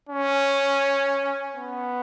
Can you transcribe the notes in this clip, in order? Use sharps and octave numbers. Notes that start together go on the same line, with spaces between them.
C#4
B3